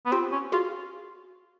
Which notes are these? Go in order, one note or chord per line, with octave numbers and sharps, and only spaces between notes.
B3
C4 F4 G4
C#4
F4 F#4 G#4